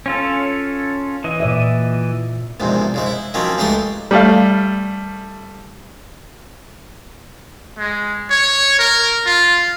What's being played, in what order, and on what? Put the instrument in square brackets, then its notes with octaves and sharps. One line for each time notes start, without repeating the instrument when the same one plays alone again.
[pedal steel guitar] C#4 F4 A4
E3 D#5
[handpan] A#2 D5 E5
[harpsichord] A#1 E2 G#2 C3
G#2 C#3 G#3
E4
D#3 F3 F#3 A#3 C4 C#4
C#2 G#3 A3 D#4 G4 C6
[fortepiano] G3 A3 F5
[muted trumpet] G#3
C#5
A#4
F4